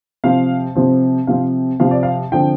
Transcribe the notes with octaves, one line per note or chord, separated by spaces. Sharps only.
C3 F3 C4 F5
C3 F3 C4
C3 F3 C4 F5
C3 F3 C4 F5
D5
F5
D3 F3 C4 G5